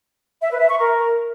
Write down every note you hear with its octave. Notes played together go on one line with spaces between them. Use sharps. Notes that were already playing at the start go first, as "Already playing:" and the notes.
E5
B4
E5
C#6
A#4